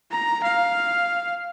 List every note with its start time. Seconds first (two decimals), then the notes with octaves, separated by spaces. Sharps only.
0.11 A#5
0.44 F5